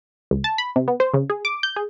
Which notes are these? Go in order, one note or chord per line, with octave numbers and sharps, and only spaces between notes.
C#2
A5
B5
C3
B3
C5
C#3
G#4
D6
G6
G#4